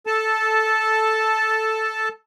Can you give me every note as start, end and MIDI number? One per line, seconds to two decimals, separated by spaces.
0.07 2.09 69
0.07 2.09 81